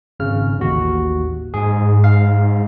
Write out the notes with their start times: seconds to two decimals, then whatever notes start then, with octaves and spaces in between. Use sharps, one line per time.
0.20 G#1 C#3 F6
0.59 A1 D#2 F#4
1.54 G#2 G#4
2.04 F5